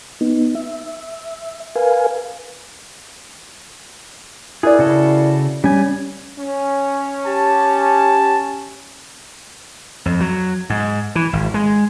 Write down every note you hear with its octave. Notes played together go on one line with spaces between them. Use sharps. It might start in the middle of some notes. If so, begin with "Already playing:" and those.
B3 D#4
E5
A#4 B4 F5 G#5
E4 G#4 A#4 D5
C#3 F#4 A4
G3 C#4 G#5
C#4
G4 A5
F2
F#3
G#2
E3
G#1
G#3